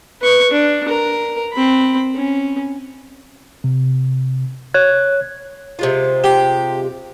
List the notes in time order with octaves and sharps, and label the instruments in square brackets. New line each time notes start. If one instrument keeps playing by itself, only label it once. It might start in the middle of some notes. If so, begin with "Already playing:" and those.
[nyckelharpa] B4 C#6
D4
A#4
C4 B5
C#4
[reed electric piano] C3
C#5 F#6 G#6
[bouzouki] C3 G#3 F4
[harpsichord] G4